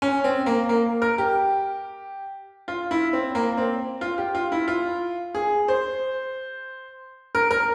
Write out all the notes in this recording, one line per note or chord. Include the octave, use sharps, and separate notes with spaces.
C#4
C4
A#3
A#3
A#4
G4
F4
E4
C4
A#3
C4
F4
G4
F4
E4
F4
G#4
C5
A#4
A#4